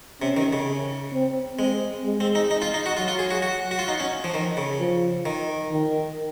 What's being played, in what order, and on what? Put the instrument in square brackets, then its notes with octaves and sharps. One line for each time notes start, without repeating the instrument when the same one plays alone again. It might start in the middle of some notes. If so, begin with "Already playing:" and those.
[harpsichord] C3 [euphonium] C#4
[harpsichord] D#3
C#3
[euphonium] C4
[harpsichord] G#3 [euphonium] C4
[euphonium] G#3
[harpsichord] C4
D#4
D#4
F4
D#4
F#4
[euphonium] F#3 [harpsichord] F4
[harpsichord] F4
G#4
F#4
F#4
F#4
F4
D#4
C#4
F3
D#3
C#3
[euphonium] F3
[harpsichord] D#3
[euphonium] D#3